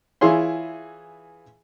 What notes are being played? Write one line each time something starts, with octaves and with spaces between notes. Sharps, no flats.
E3 E4 F4 G#4 C#5 C6